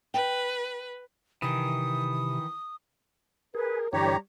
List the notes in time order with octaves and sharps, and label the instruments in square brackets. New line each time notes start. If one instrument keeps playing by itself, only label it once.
[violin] B4 [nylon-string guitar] G5
[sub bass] C3 [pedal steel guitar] D#3 E3 [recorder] D#6
[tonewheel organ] G#4 [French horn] A#4 [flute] B4
[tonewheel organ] G2 D3 E3 [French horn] G3 [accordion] G4 C#5 [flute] A#5